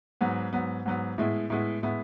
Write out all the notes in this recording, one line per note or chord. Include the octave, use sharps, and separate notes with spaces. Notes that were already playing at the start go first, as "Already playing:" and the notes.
G#2 F#3 B3
G#2 F#3 B3
G#2 F#3 B3
A2 G#3 B3 E4
A2 G#3 B3 E4
A2 G#3 B3 E4